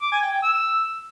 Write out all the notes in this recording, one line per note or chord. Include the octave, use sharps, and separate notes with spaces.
D6
G#5
G5
G5
E6